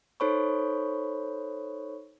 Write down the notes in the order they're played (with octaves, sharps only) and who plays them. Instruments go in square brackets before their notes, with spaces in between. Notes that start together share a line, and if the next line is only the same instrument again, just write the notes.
[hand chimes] D#4 A4 C5 C#5 B5 C#6